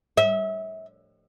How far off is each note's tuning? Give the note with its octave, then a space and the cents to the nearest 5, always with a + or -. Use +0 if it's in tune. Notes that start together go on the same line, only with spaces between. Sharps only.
E5 -30